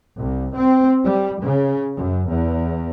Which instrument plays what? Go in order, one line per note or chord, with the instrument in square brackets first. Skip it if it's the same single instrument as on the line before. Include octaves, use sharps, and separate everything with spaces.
[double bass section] C2
C4
G3
C#3
F#2
E2